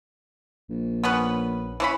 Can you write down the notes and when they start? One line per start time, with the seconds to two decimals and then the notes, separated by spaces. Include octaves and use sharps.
0.70 A#1
1.04 B3 C#4 B4
1.80 E3 C#4 B5